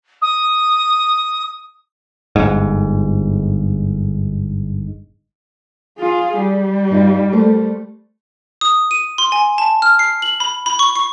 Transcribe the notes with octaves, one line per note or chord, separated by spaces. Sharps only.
D#6
G1 G#2
F4 G#4
G3
G2 D#4 F4
A3 A#4 C5
D#6
D#7
C6
G#5
A5
F6
C7
F#7
B5
B5
C#6
C#6